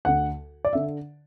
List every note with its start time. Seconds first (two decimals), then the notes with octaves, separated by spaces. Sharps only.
0.05 D2 D3 F#5
0.65 D5
0.73 D3 E5